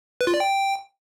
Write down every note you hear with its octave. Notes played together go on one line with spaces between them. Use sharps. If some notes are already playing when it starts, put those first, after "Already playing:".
B4
F4
D5
G5